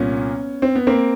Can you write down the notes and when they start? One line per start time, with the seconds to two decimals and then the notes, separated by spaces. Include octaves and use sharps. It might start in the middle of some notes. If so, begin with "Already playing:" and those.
Already playing: C2 A#2 B3 C#4
0.62 C4
0.75 B3
0.87 A#3 C4